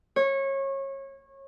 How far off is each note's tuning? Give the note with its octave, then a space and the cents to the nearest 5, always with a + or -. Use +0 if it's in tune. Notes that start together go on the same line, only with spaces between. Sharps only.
C#5 -25